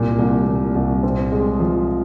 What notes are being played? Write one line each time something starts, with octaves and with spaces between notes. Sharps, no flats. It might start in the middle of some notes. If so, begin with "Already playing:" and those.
Already playing: C2 A#2
C2
A#2
C2
C4
G#3
F3